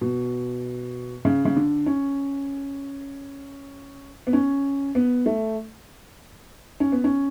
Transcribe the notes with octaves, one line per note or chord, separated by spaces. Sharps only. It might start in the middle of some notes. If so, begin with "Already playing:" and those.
B2
C#3
C#3
D3
C#4
B3
C#4
B3
A3
C#4
B3
C#4